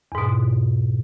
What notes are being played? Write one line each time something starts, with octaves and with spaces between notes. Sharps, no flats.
E2 G#2 B2